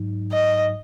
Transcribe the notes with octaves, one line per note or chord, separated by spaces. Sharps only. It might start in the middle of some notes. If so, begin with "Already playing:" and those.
Already playing: G#2 F#3 D#4
D#5